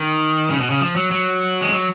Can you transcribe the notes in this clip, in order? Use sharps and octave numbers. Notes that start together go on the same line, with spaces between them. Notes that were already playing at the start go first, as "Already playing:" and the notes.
Already playing: D#3
C#3
B2
C#3
F3
F#3
F#3
G#3
F#3